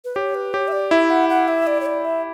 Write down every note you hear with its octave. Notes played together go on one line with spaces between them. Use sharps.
B4
G4 C#5
B4
G4 C#5
E5
D5
E4 E5
F#5
F#5
E5
D5
C#5
D5
E5